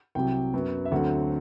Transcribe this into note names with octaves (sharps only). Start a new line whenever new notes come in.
C2 C3 F#3 G5
F#2 F#3 B3
E5
D2 D3 F#3 C4 F#5